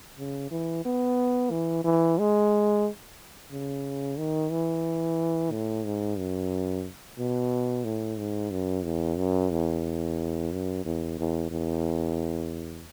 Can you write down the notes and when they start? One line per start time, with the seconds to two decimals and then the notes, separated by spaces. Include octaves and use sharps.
0.18 C#3
0.51 E3
0.85 B3
1.51 E3
1.84 E3
2.18 G#3
3.52 C#3
4.18 D#3
4.51 E3
5.52 A2
5.85 G#2
6.18 F#2
7.18 B2
7.84 A2
8.18 G#2
8.51 F#2
8.84 E2
9.18 F#2
9.52 E2
10.52 F#2
10.85 E2
11.19 E2
11.51 E2